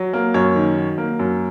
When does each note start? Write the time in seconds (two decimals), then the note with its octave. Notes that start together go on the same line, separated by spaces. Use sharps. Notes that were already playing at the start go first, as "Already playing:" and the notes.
Already playing: F#3
0.13 A#3
0.34 F#2 C#5
0.56 D#3
0.77 F#3
0.98 A#3
1.19 F#2